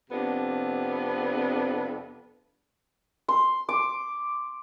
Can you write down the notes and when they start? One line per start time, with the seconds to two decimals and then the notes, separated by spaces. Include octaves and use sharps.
0.10 F2 C3 B3 D4
3.28 C6
3.69 D6